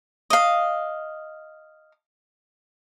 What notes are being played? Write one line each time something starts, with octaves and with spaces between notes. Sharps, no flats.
D#5 F5